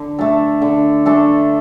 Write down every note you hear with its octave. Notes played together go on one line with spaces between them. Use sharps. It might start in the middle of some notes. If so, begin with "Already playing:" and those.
Already playing: D3
A3 D4 A4
D3
A3 D4 A4